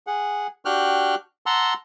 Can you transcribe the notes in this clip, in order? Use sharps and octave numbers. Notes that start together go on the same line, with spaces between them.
G#4 F#5
D4 F#4 G4 G5 F6 F#6
F#5 A5 A#5 C6 E6